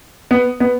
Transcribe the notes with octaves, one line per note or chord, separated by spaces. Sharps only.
B3
B3